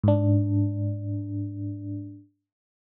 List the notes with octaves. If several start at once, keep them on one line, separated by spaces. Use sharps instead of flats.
G#2 D4